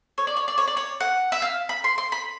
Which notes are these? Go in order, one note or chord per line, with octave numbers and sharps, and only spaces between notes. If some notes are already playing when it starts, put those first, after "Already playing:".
C#5
D5
C#5
D5
C#5
D5
C#5
F#5
E5
F5
B5
C6
C6
B5